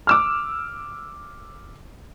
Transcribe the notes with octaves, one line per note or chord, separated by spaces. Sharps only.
D6 E6 F6